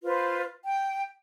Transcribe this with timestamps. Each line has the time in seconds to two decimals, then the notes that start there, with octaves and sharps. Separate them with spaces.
0.04 F4 B4 C5
0.64 G5